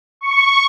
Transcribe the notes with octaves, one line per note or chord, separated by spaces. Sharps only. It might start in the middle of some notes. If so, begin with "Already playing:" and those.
C#6